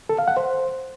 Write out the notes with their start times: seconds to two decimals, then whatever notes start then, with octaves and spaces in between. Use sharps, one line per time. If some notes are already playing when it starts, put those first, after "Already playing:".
0.09 A4
0.19 F5
0.28 F#5
0.37 C5